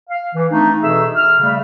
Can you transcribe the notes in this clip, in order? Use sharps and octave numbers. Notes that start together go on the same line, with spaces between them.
F5
E3
A3 C4 D4 D#4
B2 E3 G#4 A4 E5 E6
F6
C#3 G3 A3 E5